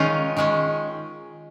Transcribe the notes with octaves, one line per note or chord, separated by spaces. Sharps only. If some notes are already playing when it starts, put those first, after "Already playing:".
Already playing: D#3 G#3 C#4 D#4 F4
D#3 G#3 C#4